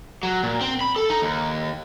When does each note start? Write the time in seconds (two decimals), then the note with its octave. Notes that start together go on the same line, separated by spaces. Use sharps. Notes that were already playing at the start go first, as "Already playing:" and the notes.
0.23 F#3
0.43 A#2
0.61 C4
0.81 B5
0.96 A4
1.10 D#4
1.22 D#2